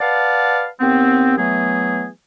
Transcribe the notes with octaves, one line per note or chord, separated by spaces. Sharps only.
B4 D5 F5 F#5 A5
D#2 B3 C4
E3 F#3 A3 B3 G#4